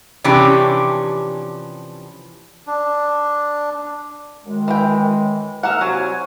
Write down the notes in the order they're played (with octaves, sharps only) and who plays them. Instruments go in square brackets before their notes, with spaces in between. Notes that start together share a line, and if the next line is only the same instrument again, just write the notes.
[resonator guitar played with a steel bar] C3 E3 F3 C#4 D4 G4
[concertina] D4
[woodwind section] F#2 D#3 G#3
[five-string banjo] E3 G5
[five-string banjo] A#3 F#5 [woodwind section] A#5 E6 F6
[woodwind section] C2 C5 G#5 [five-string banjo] F#3